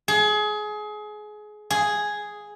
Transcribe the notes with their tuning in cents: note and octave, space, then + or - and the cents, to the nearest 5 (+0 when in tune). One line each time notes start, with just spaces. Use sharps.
G#4 +25
G#4 +0